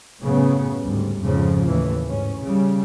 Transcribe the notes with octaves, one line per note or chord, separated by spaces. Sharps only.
F#2 A2 C#3 B3
D2 G#2 G3
F2 G#2 C#3 F3
D#2 A2 E3
G#2 C#4
C#3 G3